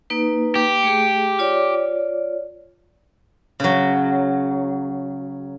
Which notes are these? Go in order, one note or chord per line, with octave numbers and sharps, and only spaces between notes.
A#3 D#4 B4
G4
A3 G#4
F4 C#5 D5
C#3 F#3